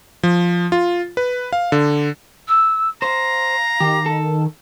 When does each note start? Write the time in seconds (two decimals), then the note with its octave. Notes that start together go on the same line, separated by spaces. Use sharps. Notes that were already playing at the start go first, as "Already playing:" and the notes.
0.23 F3
0.72 F4
1.17 B4
1.53 F5
1.72 D3
2.47 E6
3.02 C5 F5 A#5
3.80 D#3 G4
4.06 A4